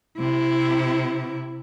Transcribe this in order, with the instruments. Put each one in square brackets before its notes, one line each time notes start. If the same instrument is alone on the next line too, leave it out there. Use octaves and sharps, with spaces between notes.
[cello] C3 E4